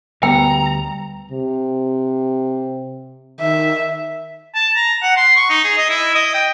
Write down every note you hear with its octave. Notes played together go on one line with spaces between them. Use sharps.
D2 G3 B3 G5 A#5
C3
D#3 E5
A5
A#5
F#5
C6
C#6
D#4
G#4
D#5
E4
D#5
G5